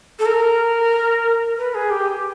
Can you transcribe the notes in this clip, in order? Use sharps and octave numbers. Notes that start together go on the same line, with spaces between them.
A4
A#4
B4
G#4
G4